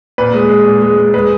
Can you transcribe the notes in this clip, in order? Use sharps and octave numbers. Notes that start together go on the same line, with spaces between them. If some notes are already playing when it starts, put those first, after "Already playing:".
A#2 B4
G#3
G#3
A#2
G#3
G#3
G#3 B4